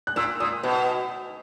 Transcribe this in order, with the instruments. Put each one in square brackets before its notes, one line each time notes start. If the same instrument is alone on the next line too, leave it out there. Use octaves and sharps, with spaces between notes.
[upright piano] F#6
[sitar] A#2 [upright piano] E6
[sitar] A#2 [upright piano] D#6
[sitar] B2